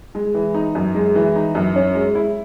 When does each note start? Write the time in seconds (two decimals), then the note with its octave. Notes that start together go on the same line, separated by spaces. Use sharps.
0.15 G#3
0.34 E3
0.54 D#4
0.75 F#2
0.95 G#3
1.15 E3
1.36 D#4
1.55 F#2
1.76 C#4
1.95 G#3
2.15 E4